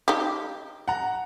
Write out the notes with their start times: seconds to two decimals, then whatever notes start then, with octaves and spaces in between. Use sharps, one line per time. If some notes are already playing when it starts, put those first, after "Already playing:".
0.08 D#4 G4
0.88 F#5 A#5